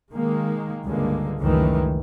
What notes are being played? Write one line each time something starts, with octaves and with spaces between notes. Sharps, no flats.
D#3 G#3 A#3
C#2 G2 D3 G#3 A#3
C#2 F#2 A2 D#3 E3